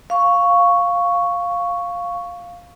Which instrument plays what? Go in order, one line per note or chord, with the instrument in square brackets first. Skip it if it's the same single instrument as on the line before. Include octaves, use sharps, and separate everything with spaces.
[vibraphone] F5 C#6